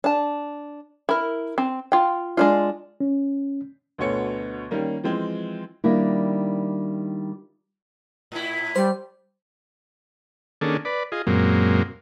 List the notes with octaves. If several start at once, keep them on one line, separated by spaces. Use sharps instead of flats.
D4 A5
E4 A#4
C4
F4 G5
G#3 D4 F4
C#4
D2 B2 D3 B3 C#5 C#7
D#3 G3 A#3 C#4
E3 F3 G#3 C4
D#3 G3 A#3 D4 E4
A2 E4
G3 C5
D#3 A#3 C#4 D4 G#4 A4
B4 D5
F4 G#4 D#5
F#2 A#2 F#3 G#3 A#3 C4